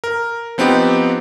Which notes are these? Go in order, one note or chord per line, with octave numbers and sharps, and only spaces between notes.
A#4
F3 B3 C4 D#4 G4